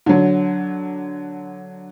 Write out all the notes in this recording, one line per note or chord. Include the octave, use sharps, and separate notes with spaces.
D3 F#3